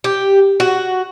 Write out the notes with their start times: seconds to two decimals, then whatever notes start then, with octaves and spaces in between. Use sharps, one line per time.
0.04 G4
0.60 F#4